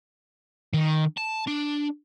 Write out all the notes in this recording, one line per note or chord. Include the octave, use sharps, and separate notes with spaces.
D#3
A5
D4